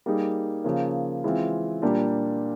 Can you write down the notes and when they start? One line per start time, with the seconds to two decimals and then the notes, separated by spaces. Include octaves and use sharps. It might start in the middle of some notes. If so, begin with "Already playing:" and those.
0.06 G3 A#3 D#4 G#4
0.64 C#3 F3 A#3
1.24 E3 G#3 C4 F4
1.82 A#2 G3 A#3 D4 G4